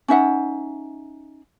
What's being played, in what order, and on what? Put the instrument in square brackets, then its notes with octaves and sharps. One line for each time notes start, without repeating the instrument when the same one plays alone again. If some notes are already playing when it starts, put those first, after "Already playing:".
[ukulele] C#4 D#4 E5 F#5